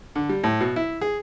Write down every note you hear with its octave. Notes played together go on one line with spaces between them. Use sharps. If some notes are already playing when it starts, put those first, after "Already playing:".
D3
G3
A2
B2
E4
G#4